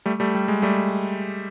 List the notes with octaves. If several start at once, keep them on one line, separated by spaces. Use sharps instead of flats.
G3 A3
G3 A3
G3
G#3
G3 A3